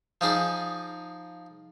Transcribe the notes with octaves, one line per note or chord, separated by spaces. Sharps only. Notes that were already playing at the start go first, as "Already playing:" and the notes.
F3 D#4 G#4 D5